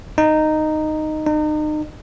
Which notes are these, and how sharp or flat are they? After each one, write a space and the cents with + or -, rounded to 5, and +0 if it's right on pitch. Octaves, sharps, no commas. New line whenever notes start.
D#4 -10
D#4 -35